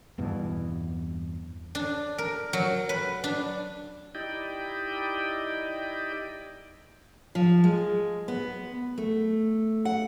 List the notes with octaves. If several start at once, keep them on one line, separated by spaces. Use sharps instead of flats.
E2 G2 B2 E3
D4
A#4
F#3
B4
D4
D#4 E4 G4 D5 D#5 G5
F3
G#3
B3
A3
F#5